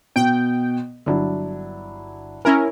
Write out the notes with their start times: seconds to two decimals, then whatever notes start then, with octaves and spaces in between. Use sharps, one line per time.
0.16 B2 G5
1.06 G1 F#3 D4 E4
2.45 C#4 E4 A#4 G#5